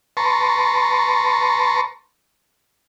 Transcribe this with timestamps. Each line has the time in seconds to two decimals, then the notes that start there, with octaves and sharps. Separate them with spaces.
0.17 B4 A5 A#5 C6 C#6